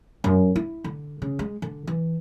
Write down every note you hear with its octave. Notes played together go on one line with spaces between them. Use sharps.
F#2
E4
D3
C#3
G#3
D3
E3